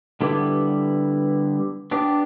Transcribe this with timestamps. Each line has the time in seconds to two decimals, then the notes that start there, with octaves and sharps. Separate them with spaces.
0.21 D3 G3 B3 E4
1.91 B3 D4 G4